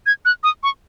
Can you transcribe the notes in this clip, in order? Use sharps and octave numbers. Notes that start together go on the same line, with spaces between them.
G#6
F#6
D#6
C#6